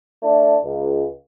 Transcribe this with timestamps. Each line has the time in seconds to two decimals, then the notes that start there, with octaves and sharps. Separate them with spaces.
0.23 A3 D4 E4
0.64 C#2